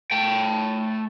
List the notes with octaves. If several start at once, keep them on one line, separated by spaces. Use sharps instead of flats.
A3 G5